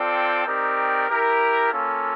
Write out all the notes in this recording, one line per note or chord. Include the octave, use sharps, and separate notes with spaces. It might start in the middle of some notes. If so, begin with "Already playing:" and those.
Already playing: C4 F4 A4 D5 G5
C4 D#4 G4 A#4 D5
E4 G4 A#4
A#3 C#4 F4 A4